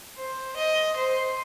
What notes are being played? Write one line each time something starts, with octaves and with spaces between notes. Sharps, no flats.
C5
D#5
C5